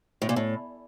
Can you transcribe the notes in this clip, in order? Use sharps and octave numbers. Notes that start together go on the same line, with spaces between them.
A2
A#2
A2